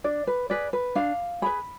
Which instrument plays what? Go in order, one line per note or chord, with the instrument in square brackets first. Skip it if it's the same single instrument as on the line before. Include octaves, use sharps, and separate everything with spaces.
[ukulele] D4 D5
B4
G#4 B4 D5
B4
D4 F5
G#4 B4 B5